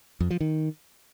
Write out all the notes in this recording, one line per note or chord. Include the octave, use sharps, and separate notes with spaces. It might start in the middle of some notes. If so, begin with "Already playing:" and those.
F2
F3
D#3